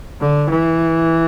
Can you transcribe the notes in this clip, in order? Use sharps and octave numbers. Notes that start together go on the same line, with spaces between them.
D3
E3